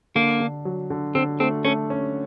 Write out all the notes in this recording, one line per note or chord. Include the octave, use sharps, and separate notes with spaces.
D3 A#3
D3
F#3
D3
D3 C4
A3 C4
A3 C#4
C#4